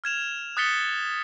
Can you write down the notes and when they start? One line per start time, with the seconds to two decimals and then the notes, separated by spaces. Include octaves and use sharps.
0.04 F6 G#6 E7 F7
0.57 D#6 F#6 A6 B6 C#7 G7